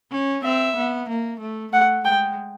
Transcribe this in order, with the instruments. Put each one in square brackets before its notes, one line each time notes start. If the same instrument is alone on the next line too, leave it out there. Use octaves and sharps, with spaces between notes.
[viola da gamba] C#4
[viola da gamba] C4 [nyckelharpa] E5
[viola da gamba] B3
A#3
A3
[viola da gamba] A3 [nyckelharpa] F#5
[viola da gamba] G#3 [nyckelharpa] G5